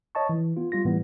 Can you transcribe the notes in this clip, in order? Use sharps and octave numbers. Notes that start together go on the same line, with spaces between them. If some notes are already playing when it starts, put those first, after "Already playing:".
C#5 D#5 A5 C#6
E3
B3 F4
G3 F4 A#6
A2 E3 G3 B3